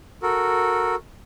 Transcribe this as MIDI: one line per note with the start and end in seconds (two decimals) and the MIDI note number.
0.23 0.95 66
0.23 0.95 69
0.23 0.95 70